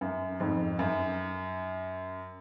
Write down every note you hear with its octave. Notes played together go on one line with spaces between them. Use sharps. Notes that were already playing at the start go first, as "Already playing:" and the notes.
F#2
F2 G#2
F#2